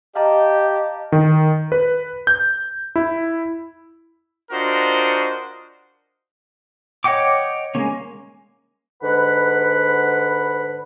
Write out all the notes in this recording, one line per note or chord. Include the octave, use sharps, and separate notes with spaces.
G4 D#5 F5 A5 A#5
D#3
B4
G6
E4
D4 F4 F#4 A#4 C5 D#5
C#5 D#5 F#5 G5 D6
G#3 A#3 C#4
G#2 D3 B4 F#5 B5